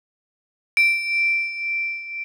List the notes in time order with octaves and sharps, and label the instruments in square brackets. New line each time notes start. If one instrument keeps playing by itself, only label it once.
[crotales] D7